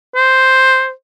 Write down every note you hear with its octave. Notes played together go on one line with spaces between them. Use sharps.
C5